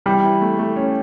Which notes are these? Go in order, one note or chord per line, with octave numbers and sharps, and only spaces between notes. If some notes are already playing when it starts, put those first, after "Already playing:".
E3 G3
E3
A3
A3
C#4